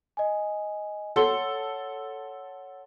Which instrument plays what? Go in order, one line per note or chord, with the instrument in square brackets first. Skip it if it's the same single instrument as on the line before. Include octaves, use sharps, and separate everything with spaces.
[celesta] D#5 G#5
[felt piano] A4 C6 [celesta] C#5 F#5 G7